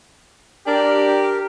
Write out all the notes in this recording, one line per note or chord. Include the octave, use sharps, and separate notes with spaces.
D4 G4 A#4